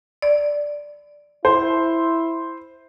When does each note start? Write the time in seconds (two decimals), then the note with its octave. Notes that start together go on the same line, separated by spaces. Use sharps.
0.22 D5
1.45 E4 C5